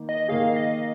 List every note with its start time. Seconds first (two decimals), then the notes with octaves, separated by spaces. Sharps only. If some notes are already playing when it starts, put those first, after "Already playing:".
Already playing: D#3 A#3 D#4
0.09 D#5
0.28 D#3 A#3 D#4 G#4 F5
0.56 D#5